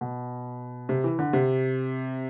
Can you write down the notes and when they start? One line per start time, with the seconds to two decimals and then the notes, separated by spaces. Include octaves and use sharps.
0.01 B2
0.89 C3
1.04 E3
1.19 D3
1.33 C3